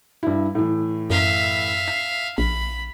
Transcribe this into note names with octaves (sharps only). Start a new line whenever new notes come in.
G2 E4
A2 E3
F#2 E5 F5
C7
A#1 B5